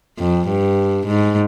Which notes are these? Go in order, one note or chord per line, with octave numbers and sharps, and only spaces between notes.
F2
G2
G#2